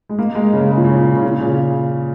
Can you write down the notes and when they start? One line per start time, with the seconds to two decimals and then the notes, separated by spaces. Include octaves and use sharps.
0.09 G#3
0.19 A#3
0.35 G#3
0.53 C#3
0.71 C#3
0.77 A#2
0.84 C#3
1.16 C#3
1.23 A#2
1.40 C#3